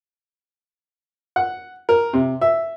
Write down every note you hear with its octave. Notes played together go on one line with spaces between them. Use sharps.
F#5
A#4
C3
E5